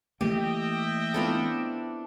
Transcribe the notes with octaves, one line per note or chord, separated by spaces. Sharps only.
E3 A3 A#3 G4 D#5 E5 G5
B3 C4 D4 E4 F4 A4